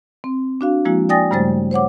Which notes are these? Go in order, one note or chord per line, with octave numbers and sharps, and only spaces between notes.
C4
D4 F#4 F5
F3 G#3 A#3 E4 F#4
D5 G5 G#5 D#6 A6 A#6
G2 C#3 G3 A3 C5 A6
C5 C#5 F#5 D6